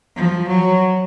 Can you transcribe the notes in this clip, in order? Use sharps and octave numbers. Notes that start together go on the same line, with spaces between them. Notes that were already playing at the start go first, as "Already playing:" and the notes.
F3
F#3